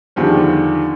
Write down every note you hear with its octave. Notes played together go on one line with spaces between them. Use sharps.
E2 D3 D#3 F3 G3